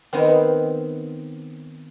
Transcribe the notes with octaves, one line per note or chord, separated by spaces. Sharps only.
D#3 B3 C4